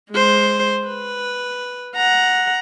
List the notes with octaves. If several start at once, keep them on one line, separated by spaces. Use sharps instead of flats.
G#3 C5
B4
F#5 A#5